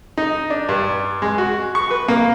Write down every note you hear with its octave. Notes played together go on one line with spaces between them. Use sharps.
D#4
D4
G2
G#3
F#4
C#6
B4
A#3